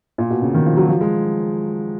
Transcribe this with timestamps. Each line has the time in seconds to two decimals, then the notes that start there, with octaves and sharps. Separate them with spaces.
0.18 A#2
0.30 B2
0.42 C#3
0.54 D#3
0.66 F3
0.77 F#3
0.89 F3
1.01 G#3